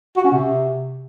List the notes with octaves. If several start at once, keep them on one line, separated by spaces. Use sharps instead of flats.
F#4
C#4
C3